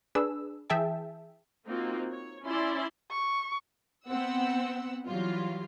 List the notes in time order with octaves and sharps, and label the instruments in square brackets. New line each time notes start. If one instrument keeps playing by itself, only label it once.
[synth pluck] D4 G#4 B4 E6
E3 G#4 E5 G5 A5
[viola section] A#3 C4 D#4 F4 F#4
C#5
C#4 E4 D5 C6
[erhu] C#6
[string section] B3 C4 F#5 E6
E3 F#3 G3 F4